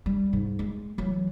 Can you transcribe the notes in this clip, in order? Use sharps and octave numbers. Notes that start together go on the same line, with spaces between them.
G3
G#2
G#3
E3 F#3